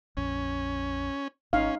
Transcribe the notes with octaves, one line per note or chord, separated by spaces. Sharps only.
A#1 F2 C#4
G#1 C#4 D#4 F5